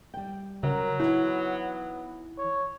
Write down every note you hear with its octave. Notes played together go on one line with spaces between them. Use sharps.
G3 G5
C#3 F#3 A#4
E3 B3 D#4 E4 F#4
C#5